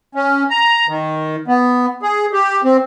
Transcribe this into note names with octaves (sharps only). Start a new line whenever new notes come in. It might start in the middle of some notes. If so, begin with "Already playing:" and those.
C#4
A#5
D#3
B3
G#4
G4
C4